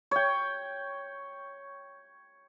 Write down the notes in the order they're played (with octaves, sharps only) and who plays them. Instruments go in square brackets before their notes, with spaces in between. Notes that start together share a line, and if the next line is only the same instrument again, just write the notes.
[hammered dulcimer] C#5 G5